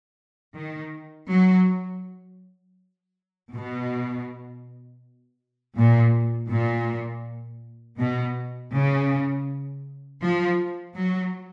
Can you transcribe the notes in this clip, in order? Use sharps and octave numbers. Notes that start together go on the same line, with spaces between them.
D#3
F#3
B2
A#2
A#2
B2
C#3
F3
F#3